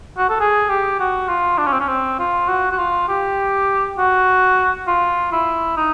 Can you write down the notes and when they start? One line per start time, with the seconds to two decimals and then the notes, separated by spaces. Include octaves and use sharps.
0.17 F#4
0.29 A4
0.40 G#4
0.69 G4
1.00 F#4
1.28 F4
1.58 D4
1.66 C#4
1.73 C4
1.80 C#4
1.88 C4
2.19 F4
2.48 F#4
2.71 F#4
2.78 F4
3.08 G4
3.98 F#4
4.87 F4
5.32 E4
5.77 D#4